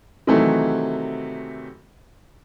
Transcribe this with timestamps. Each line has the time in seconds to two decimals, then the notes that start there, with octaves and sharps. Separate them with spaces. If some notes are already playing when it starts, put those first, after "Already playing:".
0.27 C3 D#3 E3 F#3 A3